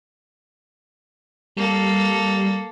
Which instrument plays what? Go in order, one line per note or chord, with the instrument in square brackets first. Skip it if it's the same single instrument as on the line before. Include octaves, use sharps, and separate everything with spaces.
[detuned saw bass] G3 [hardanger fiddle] A#3 A4